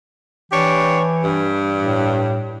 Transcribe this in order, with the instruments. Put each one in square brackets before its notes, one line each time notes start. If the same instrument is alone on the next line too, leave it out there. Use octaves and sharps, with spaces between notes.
[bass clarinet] E3 [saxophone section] D4 G4 C#5
[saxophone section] G2
[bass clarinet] A2